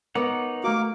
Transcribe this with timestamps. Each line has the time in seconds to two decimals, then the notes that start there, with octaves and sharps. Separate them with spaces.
0.15 B3 D#4 A#4 B4 C#5 F#5 D6
0.64 A3 A#3 F#4 D6